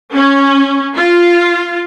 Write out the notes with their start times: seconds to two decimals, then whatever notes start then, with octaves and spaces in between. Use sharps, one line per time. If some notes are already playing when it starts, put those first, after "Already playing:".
0.14 C#4
0.95 F4